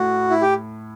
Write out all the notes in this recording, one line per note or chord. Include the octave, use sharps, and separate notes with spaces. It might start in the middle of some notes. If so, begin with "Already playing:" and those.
Already playing: A2 F#4
E4
G4